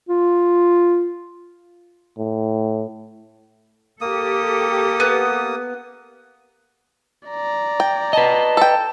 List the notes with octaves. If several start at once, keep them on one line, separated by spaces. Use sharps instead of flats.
F4
A2
A#3 G4 A4 D#6
B3
D5 A#5
G5
B4 D#5 A5
A4 G5